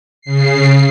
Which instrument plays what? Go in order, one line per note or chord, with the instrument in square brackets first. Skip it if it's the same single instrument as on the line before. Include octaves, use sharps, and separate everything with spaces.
[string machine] C#3 C7